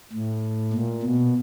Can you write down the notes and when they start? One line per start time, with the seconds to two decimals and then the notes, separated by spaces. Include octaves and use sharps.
0.13 A2
0.73 A#2
1.02 B2